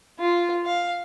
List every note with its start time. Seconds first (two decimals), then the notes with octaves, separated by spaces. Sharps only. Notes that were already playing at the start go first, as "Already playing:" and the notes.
0.19 F4
0.66 F5